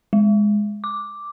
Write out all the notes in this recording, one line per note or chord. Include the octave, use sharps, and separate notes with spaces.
G#3
D6